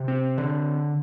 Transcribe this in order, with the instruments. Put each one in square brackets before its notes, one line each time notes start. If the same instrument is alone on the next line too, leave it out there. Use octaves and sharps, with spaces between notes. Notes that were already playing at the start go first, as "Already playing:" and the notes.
Already playing: [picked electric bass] C3
C4
D3